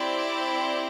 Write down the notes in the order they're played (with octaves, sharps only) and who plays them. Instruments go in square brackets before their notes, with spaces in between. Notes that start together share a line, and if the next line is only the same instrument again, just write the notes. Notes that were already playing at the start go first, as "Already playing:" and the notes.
Already playing: [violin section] C4 E4 G4 D5